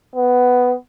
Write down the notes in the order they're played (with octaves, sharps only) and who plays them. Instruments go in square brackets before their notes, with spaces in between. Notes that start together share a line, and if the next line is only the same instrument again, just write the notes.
[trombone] B3